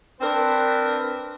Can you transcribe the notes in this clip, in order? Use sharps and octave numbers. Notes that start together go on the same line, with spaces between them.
C4 D4 A#4 B4